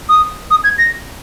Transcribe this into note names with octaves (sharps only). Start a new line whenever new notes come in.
D#6
D#6
G#6
A#6